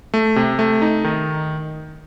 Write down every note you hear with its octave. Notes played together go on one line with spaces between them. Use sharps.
A3
C3
A3
D#4
D#3